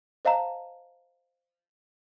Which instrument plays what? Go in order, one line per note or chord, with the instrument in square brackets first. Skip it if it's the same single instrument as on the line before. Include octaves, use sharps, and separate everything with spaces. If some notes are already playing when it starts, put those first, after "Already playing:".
[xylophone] C5 D#5 F5 A5 A#5